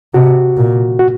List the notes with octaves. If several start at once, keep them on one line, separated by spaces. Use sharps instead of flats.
C3 F#4
A#2
F#4